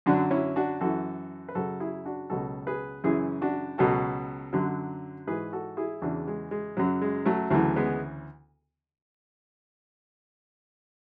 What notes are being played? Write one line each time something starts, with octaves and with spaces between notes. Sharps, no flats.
F#2 D3 F#3 D4 F#4
C#4 E4
D4 F#4
F#2 E3 F#4 A4
B4
F#2 C#3 F#3 F#4 A4
E4 G#4
D4 F#4
C#2 B2 F#3 F#4 A4
G#4 B4
F#2 C#3 E3 E4 G#4
D4 F#4
C#2 B2 F#3 F#4 A4
F#2 D3 F#3
G#2 E3 G#4 B4
F#4 A4
E4 G#4
E2 C#3 E3 D4 F#4
G#3
G#3
F#2 C#3 F#3
G#3
F#3 A3
D2 C#3 E3 F#3 A3
G#3 B3